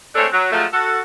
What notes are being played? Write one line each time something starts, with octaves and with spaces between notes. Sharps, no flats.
G#3 A3 C4 D4 A4 C#5
F#3
F3 F#3 G#3 A3
F#4 A4